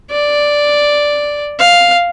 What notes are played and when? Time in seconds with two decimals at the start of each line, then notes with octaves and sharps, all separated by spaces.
0.11 D5
1.59 F5